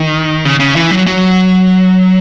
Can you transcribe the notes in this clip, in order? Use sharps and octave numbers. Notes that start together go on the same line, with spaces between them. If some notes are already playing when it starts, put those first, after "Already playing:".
Already playing: D#3
C#3
C#3
E3
F#3
F#3